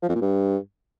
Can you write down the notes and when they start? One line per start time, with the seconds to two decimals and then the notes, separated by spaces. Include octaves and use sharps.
0.03 F3
0.09 F2
0.15 A#2
0.22 G2